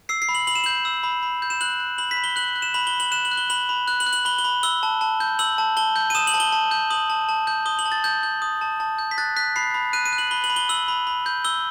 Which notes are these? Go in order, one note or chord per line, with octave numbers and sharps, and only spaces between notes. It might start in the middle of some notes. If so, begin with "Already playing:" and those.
E6 C7
C7
B5
F#7
B5 F#7
E7
G6 F#7
E6
B5
B5
G6
E7
F#6 F#7
F#6
B5 F#7
B6
B5
G7
F#6 F#7
F#6
E7
B5 F#7
G7
B5
F#7
F#6 E7
F#7
F#6
G7
B5 F#7
B5
F#6
F#7
F#6
F#7
B5 G7
G7
B5
E6 G7
A5
A5
G6
E6 F#7
A5
A5 G7
G6
D#7
D#6 E7
F#7
A5
G7
A5
G6
D#6 F#7
A5
A5
G6
D#6 G7
F#7
A5
A6
A5 G6
G6
D#6
A5
A5
G6
B6
F#6 A6
F#6 B6
B5 C7
B5
F#6 D#7
D#7
F#6
F#7
B5 G7
F#7
B5
G7
E6 F#7
B5
B5
G6
E6 G7